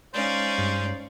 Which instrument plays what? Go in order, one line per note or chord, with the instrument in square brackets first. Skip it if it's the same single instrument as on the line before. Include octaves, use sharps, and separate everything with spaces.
[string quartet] G#3 D5 F5 [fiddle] C#4 D#4 [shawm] C5
[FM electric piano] G2